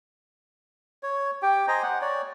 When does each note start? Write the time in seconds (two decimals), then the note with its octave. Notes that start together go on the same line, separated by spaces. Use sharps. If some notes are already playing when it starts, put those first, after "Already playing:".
1.03 C#5
1.42 G4 G5
1.68 C5 D#5 G#5 A#5
1.83 F#5
2.02 C#5 D5